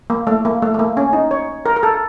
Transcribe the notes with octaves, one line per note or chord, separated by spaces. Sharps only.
A#3
A3
A#3
A3
A3
A#3
C#4
D#4
C#5
A#4
A#4
A4